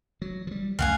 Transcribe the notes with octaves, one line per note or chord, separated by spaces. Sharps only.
F#3
F3 G3
C#2 F#2 A3 F5 F#5 G#5